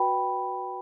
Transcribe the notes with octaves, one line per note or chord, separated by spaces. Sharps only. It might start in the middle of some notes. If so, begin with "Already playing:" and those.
Already playing: F#4 B4 G5 B5